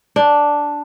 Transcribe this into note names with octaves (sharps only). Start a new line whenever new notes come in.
D4